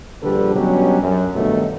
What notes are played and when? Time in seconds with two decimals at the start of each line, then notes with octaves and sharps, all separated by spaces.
0.23 A#1 D3 G3 G4 A4 B4
0.54 B2 F#3 G3 C#4 D4 G4
1.01 F#2
1.35 G2 B2 D3 D#3 F#3 A3